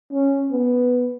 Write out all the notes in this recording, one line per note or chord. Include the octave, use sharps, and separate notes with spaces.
C#4
B3